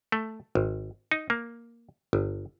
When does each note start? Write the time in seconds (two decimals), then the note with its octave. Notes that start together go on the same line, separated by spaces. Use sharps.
0.12 A3
0.55 G#1
1.11 D#4
1.30 A#3
2.13 G1